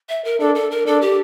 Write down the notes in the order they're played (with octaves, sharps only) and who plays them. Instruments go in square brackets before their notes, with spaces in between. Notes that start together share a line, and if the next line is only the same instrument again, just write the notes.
[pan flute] E5
A#4
[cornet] D4 [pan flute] A4
[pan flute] A4
A#4
[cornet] D4 [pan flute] A4
[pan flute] G4